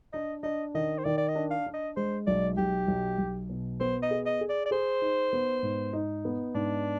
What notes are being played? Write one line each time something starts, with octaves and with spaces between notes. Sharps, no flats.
D4 D#5
D4 D#5
D#3 D#5
C5
D#3 D5
D5
D#5
D4
F5
D4
D#5
G#3 C5
B1 D5
B1 G4
B1
B1
B2
B3 C5
D#5
G#4
D#5
G#4
D5
D5
G#4 C5
D#4
B3
G#2
D#4
B3
G#2 D4